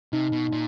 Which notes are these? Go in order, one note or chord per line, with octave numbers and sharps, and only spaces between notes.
C3 D#4
B2
A#2